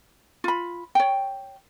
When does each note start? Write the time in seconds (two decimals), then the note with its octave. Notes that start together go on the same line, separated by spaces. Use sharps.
0.44 F4 B5
0.95 C#5 G5